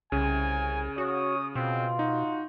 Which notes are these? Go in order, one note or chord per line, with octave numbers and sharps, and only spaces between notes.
C2 C#3 G#5
F#4 C#5 D#6
B2 C4 F4
D#4 F#4